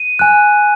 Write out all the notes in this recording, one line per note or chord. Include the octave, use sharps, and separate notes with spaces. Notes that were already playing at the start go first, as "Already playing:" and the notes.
Already playing: D#7
G#5 F#6